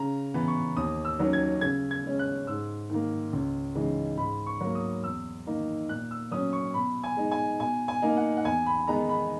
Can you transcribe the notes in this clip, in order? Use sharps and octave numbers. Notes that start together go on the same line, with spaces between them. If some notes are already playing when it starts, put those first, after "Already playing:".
Already playing: C#3 A#5
E3 B3
C#6
D#2 D#6
E6
D#3 F#3 C#4
G#6
C#3 G#6
G#6
G#3 C#4
F#6
G#2 E6
D#3 A#3
C#2
C#3 E3 G#3 D#4
G#2 B5
C#6
F#3 A#3
D#6
E2 E6
D#3 A#3 D#4
A#2 F#6
E6
F#3 C#4 D#6
C#6
B2 B5
G#5
G#3 D#4
G#5
B2 G#5
G#5
A#3 D#4
F#5
F#5
E2 G#5
B5
D#3 G#3 B3 D#4 A#5
B5